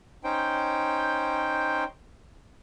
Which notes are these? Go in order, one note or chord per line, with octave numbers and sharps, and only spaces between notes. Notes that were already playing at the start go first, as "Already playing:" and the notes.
C#4 D#4 C5 G5